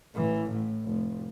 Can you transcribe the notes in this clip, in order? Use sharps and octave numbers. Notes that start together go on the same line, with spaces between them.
A1 E3
A2
F1